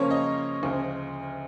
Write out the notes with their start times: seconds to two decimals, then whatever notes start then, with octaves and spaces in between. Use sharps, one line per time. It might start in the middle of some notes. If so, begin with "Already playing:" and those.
Already playing: C#3 F3 A#3 C#4 C#5
0.11 D#5
0.63 D2 C#3 F3